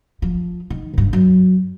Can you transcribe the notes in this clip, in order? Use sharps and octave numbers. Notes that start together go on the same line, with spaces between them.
F3
D#3
G2 C#3
F#2